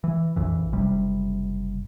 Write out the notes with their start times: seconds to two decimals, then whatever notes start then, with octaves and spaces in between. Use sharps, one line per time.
0.04 E3
0.36 A#1 F2 E3
0.73 F#1 C3 G3